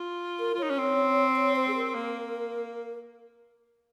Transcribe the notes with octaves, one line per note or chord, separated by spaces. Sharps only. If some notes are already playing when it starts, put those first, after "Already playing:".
Already playing: F4
A#4
F4
D#4 C#5
C#4
C4
C#5
C5
G#4
A#4
A#3